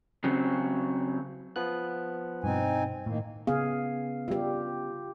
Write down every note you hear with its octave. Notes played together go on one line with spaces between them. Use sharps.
C#3 F#3 C4
F3 B3 F#6
G2 B2 C4 D#4 G#5
A2 D#3 A#3
C#3 B3 G#4 F5
G3 F4 G4 E5